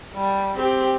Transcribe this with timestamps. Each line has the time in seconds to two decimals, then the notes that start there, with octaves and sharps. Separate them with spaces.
0.14 G3
0.56 C4 G4